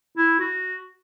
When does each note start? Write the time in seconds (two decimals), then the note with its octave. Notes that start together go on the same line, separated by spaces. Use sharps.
0.17 E4
0.39 F#4